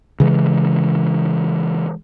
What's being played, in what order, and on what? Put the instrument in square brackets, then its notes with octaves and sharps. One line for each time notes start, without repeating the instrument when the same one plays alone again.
[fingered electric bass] C#3 E3 G#3